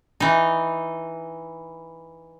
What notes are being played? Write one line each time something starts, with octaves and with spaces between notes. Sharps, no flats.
E3 D#4